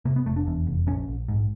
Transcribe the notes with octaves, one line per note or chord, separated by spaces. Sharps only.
C3 A#3
B3
F1 A3
D4
E2
F1
A#1 C#4
A#1
G#2